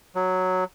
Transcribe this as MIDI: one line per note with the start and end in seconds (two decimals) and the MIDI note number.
0.15 0.64 54